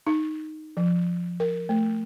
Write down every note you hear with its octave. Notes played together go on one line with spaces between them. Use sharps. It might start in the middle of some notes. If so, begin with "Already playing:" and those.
D#4
F3
A#4
A3